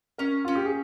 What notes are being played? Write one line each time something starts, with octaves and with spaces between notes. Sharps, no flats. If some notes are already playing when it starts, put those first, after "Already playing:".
C#4 A#4
C#4 F4
G4
G#4